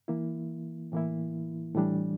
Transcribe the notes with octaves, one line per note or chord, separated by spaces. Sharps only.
E3 A#3 E4
A2 E3 A#3 E4
A2 E3 G3 D4